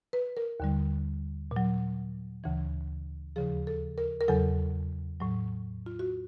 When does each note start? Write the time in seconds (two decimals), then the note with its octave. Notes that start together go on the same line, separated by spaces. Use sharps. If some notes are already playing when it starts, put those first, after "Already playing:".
0.13 B4
0.37 A#4
0.60 D#2 D3 G3
1.51 A#2
1.56 F#3
2.44 D2 C#3 E3
3.36 D#2 C#3 F3 G#4
3.67 A4
3.98 A#4
4.21 A#4
4.28 E2 C#3 F#3 A4
5.20 A2 F#3
5.86 F4
5.99 F#4